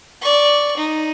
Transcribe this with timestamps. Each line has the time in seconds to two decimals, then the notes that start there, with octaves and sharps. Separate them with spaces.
0.22 D5 C#6
0.77 D#4